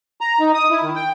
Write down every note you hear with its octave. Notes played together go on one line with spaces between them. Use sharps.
A#5
D#4
D#6
E4
D#3
G5